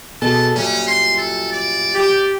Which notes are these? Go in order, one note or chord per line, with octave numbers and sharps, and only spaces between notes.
B2 G#4 A4 A5
F#2 A#2 G3 C#4
C6
A4
D5
G4